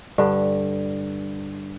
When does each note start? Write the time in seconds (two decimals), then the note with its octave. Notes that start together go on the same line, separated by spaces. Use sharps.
0.18 G2 D3